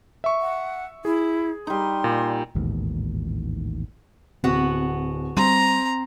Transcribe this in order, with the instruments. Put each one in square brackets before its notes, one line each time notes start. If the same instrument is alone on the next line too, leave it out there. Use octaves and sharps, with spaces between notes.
[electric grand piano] E5 C#6
[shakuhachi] F#5
[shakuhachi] E4 [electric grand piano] G#4
[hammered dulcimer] G3 D#4 [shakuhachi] C6
[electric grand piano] A#2
[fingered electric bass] A1 D#2 G#2 B2
[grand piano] D1 [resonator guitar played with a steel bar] B3 F#4 [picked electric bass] C4
[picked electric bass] G3 [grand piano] C4 C6 [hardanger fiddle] A#5